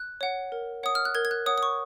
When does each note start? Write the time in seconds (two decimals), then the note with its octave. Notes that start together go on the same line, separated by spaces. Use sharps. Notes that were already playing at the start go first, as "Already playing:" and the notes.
Already playing: F#6
0.21 C#5 F#5
0.52 A#4
0.83 C#5 F#5 D#6
0.95 F6
1.05 F#6
1.15 A#4 G#6
1.25 G#6
1.31 F#6
1.46 C#5 F#5 D#6
1.58 D#6
1.63 C#6